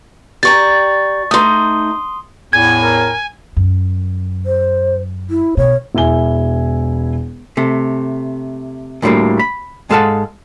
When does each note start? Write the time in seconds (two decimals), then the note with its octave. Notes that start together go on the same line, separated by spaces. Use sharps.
0.43 G4 D5 A#5 C#6 A6
1.31 A3 D#4 C6 D#6
2.53 E2 A2 G#5 G#6
2.82 A#4
3.57 F#2
4.46 C5
5.30 E4
5.57 B2 C#5
5.95 E1 E4 G#5 G7
7.57 C3 A3
9.02 D2 A2 D3 F#3 G3 A#3
9.39 B5
9.90 G#2 G#3 A4 F5 F#5 A5